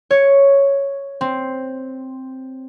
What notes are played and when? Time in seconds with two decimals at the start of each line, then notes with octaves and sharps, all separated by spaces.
0.11 C#5
1.21 C4